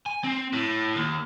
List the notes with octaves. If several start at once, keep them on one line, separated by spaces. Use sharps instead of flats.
G#5
C4
A2
D#2